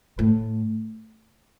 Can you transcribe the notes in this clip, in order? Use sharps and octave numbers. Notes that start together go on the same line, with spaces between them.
A2